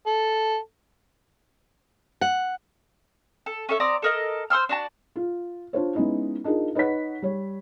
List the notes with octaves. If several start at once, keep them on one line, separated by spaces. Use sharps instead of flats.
A4
F#5
A4
C#4 A4 E5
C4 D5 A#5 D#6
A4 A#4 D#5
C5 C6 E6 F6
D4 F#4 A5
F4
D4 F4 C5 C#5
G#3 B3 C#4 D#4 E4
D4 D#4 F4 G#4 A#4
D#4 B4 C#5 F#5 B6
G3 C#5